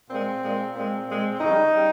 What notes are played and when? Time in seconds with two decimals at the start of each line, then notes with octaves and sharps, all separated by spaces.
0.09 A#2 G#3 C4
0.42 A#2 G#3
0.74 A#2 G#3 C4
1.07 A#2 G#3
1.39 F2 C#3 G3 D#4
1.72 C#3 G3